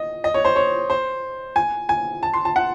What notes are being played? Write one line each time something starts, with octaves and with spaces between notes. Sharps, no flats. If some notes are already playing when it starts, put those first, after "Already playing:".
Already playing: D#5
D#5
C#5
C5
C#5
C5
G#5
G#5
A5
C6
A5
F#5